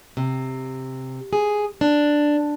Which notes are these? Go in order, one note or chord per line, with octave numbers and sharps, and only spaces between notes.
C3
G#4
D4